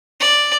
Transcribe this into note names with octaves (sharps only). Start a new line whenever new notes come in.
D5